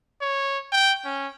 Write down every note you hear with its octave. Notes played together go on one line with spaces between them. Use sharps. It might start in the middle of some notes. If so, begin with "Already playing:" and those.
C#5
G5
C#4